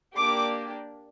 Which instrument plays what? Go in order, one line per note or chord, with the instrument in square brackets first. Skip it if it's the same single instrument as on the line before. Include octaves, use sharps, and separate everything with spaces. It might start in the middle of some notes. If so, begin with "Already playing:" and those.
[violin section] A#3 D4 G4 D6